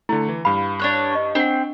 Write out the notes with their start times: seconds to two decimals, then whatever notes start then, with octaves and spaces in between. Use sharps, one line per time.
0.09 D3 A3 E4
0.29 E3
0.45 G2 F5 B5
0.79 D4 C#5 F#6
1.12 D#5 C#6
1.35 C4 D4 F#5